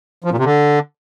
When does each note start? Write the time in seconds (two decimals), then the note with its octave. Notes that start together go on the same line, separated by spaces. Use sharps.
0.24 F3
0.31 A#2
0.38 C3
0.45 D3